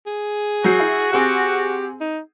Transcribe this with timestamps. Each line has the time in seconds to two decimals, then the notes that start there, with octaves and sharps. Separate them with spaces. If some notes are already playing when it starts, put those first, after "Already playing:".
0.06 G#4
0.64 F#3 F#4 G6 C7
0.79 E4
1.12 C4 G4 G#4 F#5
2.00 D#4